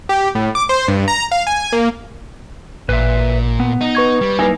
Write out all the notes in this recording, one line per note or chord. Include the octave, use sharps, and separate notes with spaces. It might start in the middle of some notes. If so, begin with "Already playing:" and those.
G4
A2
D6
C5
G2
A#5
F5
G#5
A#3
A1 A#2 B4 E5
B3
D#4
B4 C#6 G#6
G3
A#3 D#4 E4 B4 G#5